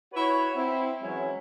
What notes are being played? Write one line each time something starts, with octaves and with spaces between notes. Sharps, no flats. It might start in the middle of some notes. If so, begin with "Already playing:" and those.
E4 F#4 B4 C#5
C4 E4
E3 F#3 G#3 C#4 E4